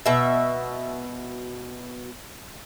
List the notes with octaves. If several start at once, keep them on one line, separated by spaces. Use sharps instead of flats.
B2 E5